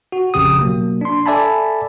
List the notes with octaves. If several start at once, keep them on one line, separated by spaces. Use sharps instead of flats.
F#4
A#1 F2 C#3 G4 D#6
B2 F#3 A#3
D4 C6
A4 D5 E5 G#5 A5 B5